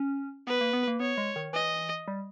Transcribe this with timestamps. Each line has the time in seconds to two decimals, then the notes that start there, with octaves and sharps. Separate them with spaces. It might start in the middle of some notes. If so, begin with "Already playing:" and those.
Already playing: C#4
0.47 B3 B4
0.61 A#3
0.73 B3
0.88 A#3
1.00 B3 C#5
1.18 G#3
1.36 D#3
1.53 E3 D#5
2.08 G3